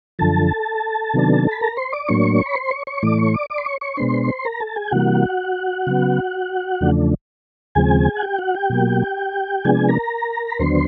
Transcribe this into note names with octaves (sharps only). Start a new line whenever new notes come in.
F#2 D3 F3 A4 A5
C3 D#3 F#3 B3 D4
B5
A#4 A#5
C5 C6
D5 D6
A2 F#3 A#3 D4 C#5 C#6
B5
C5 C6
C#5 C#6
C#5 C#6
A2 E3 A3 D5 D6
C#5 C#6
D5 D6
D5 D6
C6
C#5 C#6
C#5 C#6
B2 G#3 B3 D4 C5 C6
A#4 A#5
A4 A5
G#4 G#5
G5
C3 E3 G3 A#3 F#4 F#5
C#3 F#3 B3
E2 C#3 F3 A3 D4
D#2 C#3 F3 G#3 C4 G#4 G#5
F#5
G4 G5
F#4 F#5
G4 G5
B2 F#3 A#3
C3 F3 G#3 B3 D4 G#4 G#5
A#4 A#5
B5
D#2 D3 F#3 B3 D4 C5 C6